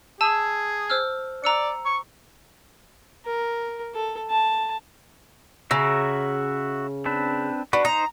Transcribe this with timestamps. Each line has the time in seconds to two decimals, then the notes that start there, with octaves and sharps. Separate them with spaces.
0.21 G#4 A5 E6 D#7
0.90 C5 E6 F6
1.44 D5 A#5 E6 C#7
1.85 C#6
3.26 A#4
3.94 A4
4.30 A5
5.71 C#3 F#4 E5 A#5
7.05 C4 D4 B4
7.73 D4 F#4 B4
7.85 D#4 C5 A#5